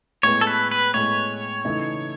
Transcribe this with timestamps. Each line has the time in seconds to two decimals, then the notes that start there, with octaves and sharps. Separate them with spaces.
0.23 A2 G#3 B3 C#5
0.41 A4
0.47 B4
0.71 B4
0.94 A2 G#3 B3 C#5
1.65 C#3 E3 A3 D#4